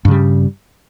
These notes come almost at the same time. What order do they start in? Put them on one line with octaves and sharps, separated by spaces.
G2 C#3 G3